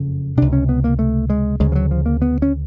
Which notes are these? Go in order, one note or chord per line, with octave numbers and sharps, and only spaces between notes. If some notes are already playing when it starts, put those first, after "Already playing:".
Already playing: F#1 F2 C#3
C#2 C3 D4
C#4
B3
A#3
A3
G#3
D2 C#3 G#3
F3
F#3
F3
A#3
B3
C#4